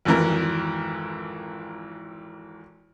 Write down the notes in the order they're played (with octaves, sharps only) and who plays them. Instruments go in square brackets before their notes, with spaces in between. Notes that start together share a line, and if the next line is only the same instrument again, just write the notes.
[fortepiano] G#1 F2 E3 A#4